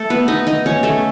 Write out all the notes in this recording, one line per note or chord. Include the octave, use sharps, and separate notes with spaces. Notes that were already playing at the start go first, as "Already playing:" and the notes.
Already playing: A3 A4
B3 B4
D#4 D#5
D#4 D#5
C#4 C#5
A3 A4